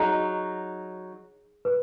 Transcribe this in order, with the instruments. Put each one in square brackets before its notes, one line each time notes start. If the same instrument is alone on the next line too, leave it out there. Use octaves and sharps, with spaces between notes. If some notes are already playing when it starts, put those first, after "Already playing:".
Already playing: [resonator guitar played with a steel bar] F#3 D#4 F#4 [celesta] G#4
[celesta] B4